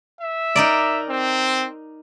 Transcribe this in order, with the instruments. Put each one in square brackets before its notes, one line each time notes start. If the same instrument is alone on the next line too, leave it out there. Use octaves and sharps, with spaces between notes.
[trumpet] E5
[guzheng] D#4 A#4 D5
[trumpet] C4